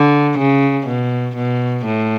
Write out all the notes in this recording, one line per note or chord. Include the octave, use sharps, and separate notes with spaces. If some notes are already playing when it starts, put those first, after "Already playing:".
Already playing: D3
C#3
B2
B2
A2